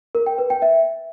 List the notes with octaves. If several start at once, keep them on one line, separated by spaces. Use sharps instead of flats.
A#4
G5
B4
G5
E5